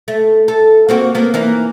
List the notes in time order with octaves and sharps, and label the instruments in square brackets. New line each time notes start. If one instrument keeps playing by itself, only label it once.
[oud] A3
A4
A#3 C4 F#4
A#3 B3
E3 A#3 D#4